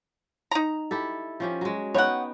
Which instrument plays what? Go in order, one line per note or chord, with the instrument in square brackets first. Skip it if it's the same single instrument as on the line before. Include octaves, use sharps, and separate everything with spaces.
[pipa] D#4 A#5
[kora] E4 G4 A4
F3 C#4 G4
F#3 G#3
[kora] B3 D#4 G5 [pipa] C#5 F#5